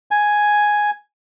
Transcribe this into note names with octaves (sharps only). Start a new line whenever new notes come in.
G#5